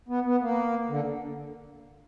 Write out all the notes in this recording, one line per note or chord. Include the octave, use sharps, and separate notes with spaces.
B3
B3
A#3
D3